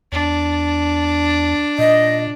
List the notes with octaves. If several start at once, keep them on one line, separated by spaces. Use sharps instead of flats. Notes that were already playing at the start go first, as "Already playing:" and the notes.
E2 D4
A#2 D#5